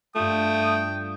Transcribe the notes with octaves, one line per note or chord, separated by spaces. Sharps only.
G2 A3 F4 G5 D#6